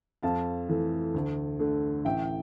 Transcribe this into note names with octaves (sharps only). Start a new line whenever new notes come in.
F2 F5 A5
E3 A3
D2
D3 A3
A1 E5 G5